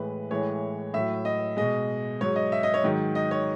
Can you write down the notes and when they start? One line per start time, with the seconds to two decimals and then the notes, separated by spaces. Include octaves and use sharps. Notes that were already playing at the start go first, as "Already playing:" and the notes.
Already playing: A2 E3 G#3 B4
0.31 A2 E3 G#3 C#5
0.94 A2 F#3 E5
1.25 D#5
1.57 B2 G#3 D#5
2.21 G#2 F#3 C#5
2.36 D#5
2.52 E5
2.63 D#5
2.74 C#5
2.84 G#2 D#3 F#3
3.15 D#5
3.31 C#5